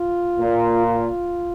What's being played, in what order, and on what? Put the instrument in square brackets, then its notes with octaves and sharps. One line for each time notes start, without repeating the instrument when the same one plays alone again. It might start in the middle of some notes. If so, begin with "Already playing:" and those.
Already playing: [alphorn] F4
[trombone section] A#2
[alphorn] F4